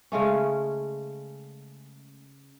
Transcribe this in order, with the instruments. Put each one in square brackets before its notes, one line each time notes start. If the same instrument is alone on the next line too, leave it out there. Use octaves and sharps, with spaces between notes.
[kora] C#3 G#3 A3 C#4